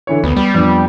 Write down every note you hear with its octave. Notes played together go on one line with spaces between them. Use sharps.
D3 E3 C#5
D2 B3
G3
F2 B3 D4